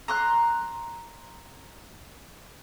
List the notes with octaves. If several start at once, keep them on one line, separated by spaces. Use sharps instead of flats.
A#5 C6 F#6